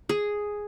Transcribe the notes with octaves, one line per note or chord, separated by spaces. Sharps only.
G#4